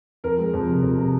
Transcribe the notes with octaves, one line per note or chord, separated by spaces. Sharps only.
F2 A#4
G#3
F2
C3
F2
C3